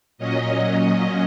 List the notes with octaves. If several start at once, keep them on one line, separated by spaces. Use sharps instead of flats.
A#2 F#3 C#4 D#5